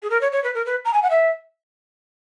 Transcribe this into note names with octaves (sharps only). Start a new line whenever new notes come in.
G#4
A#4
C#5
C#5
B4
A#4
B4
A#5
G#5
F#5
E5